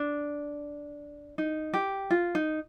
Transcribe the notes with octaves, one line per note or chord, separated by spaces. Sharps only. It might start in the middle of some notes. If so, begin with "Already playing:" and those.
Already playing: D4
D#4
G4
F4
D#4